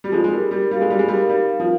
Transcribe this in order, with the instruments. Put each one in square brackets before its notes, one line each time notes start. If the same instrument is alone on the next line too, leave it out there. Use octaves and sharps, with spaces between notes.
[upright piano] G3
[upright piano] F3 G#3 [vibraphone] D#4
[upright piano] G#3
[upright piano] G3 [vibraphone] A#4
[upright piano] G3 [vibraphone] D#4
[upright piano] G3 [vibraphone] F5
[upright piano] G#3
[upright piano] G3 [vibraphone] D#4
[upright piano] G#3
[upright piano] G3 [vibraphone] A#4
[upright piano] G3 [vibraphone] D#4
[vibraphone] F5
[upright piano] F3